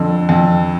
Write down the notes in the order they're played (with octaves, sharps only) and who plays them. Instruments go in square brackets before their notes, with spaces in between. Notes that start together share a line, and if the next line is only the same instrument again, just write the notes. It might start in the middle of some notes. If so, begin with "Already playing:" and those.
Already playing: [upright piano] F2 D3
F2